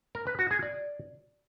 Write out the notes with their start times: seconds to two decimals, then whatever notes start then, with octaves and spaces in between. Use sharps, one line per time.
0.15 A#4
0.27 B4
0.39 F#4
0.51 G#4
0.63 D5